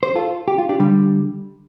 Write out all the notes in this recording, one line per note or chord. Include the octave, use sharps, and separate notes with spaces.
C5
F4 A4
G4
F4
D4 G4
D3 G3